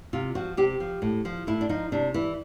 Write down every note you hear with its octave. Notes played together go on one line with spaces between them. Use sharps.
C3 F4
F3 F#4
C3 G4
F3
A2
F3
A2 E4
D4
F3 D#4
C3 D4
E3 E4